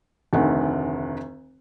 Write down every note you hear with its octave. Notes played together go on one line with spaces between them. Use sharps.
F1 D2 D#3 F#5